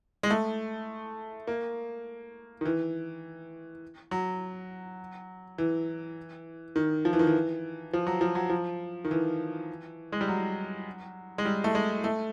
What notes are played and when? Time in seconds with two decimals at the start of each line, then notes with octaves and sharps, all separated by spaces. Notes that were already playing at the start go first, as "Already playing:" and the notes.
0.23 G#3
0.30 A3
1.47 A#3
2.61 D#3
2.65 E3
4.11 F#3
5.58 E3
6.76 D#3
7.05 F3
7.13 E3
7.19 D#3
7.27 E3
7.93 F3
8.07 F#3
8.21 F3
8.35 F#3
8.50 F3
9.04 D#3
9.11 E3
10.12 G#3
10.21 G3
10.28 F#3
11.38 G#3
11.45 G3
11.64 A3
11.75 G#3
12.04 A3